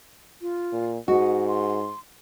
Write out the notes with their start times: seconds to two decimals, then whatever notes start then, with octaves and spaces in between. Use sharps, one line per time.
0.41 F4
0.73 A#2
1.08 G#2 F#4 D#5
1.48 C6